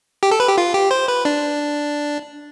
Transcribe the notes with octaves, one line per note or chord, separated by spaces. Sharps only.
G4
A4
B4
G4
F4
G4
C5
B4
D4